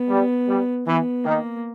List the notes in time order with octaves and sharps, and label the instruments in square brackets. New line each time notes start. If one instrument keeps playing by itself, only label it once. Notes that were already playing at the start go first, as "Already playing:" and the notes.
Already playing: [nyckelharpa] B3
[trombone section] G3
G3
[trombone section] E3 [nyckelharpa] B3
[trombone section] D#3 [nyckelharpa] A#3